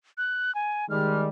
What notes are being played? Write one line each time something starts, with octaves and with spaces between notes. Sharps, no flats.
F#6
G#5
D#3 G3 G#3 F6